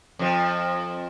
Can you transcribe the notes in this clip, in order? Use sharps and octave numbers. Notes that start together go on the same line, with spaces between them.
F2 F3